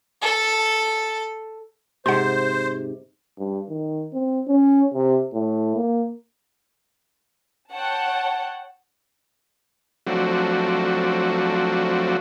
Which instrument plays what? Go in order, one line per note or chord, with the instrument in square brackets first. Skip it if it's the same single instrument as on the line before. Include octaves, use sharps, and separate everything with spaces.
[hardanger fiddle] A4 A5
[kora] G#2 C3 [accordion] C5 [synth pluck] F#5 C6
[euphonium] G2
D#3
C4
C#4
C3
A2
A#3
[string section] C#5 F#5 G5 A5
[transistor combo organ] F3 F#3 A3 C4 D4 F#4